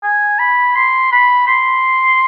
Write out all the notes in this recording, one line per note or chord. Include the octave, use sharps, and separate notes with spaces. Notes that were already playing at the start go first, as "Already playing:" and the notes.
G#5
B5
C6
B5
C6